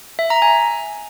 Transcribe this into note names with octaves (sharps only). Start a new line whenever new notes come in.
E5
A#5
G#5